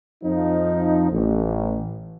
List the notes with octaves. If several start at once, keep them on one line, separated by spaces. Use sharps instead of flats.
F2 F3 D#4
A1